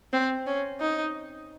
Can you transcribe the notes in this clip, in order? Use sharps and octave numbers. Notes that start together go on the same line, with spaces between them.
C4
C#4
D#4